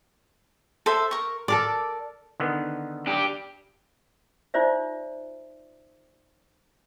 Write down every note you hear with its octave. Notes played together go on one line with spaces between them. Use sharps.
A4 C5 E5
A#4 C#6
A4 A#4 D5 D6
D3 D#3 B3
D4 G4
D#4 F4 C5 D5 E5